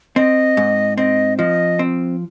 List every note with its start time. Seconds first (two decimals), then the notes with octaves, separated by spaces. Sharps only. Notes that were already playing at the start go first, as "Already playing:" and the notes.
0.16 C4 D#5
0.57 G#2
0.98 C4 D#5
1.38 F3 D#5
1.79 C4